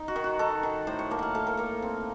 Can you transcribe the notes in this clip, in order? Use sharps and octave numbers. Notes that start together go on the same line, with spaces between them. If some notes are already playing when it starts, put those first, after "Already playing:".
Already playing: D#4
F#4
D#3
F#4
D#4 A4
D#3
A2 C5
C#5
A#3 A5
F5 F#5
A2 A4
A#4
A#3 A4
C4